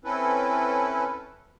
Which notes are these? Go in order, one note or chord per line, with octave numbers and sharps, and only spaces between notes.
C4 C#4 E4 A4 B4